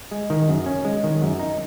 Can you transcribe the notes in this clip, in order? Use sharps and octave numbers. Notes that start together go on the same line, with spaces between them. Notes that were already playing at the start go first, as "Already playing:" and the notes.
G#3
D#3
F#2
C#4
G#3
D#3
F#2
D#4